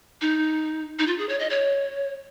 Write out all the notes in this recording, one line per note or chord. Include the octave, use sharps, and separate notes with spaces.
D#4
D#4
F4
G#4
C#5
D#5
C#5